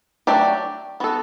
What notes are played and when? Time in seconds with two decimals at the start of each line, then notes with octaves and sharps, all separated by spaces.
0.27 F#3 A3 D4 G4 D5
1.00 B3 F#4 A4